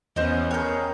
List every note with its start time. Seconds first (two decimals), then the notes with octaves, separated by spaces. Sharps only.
0.16 E2 B3 C#4 C5 D#5
0.51 G#4 A#4 C#5 G5 G6